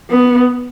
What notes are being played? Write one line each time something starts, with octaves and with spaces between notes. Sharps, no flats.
B3